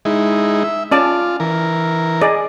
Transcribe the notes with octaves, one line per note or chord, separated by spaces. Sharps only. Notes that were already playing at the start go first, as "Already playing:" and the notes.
G#3 D#4 E4
E5
C#4 F4 D5 A5
E3 A#4
G#4 D5 D#5